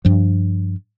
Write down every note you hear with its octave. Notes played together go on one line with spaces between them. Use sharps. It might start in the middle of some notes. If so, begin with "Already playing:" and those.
G2 F3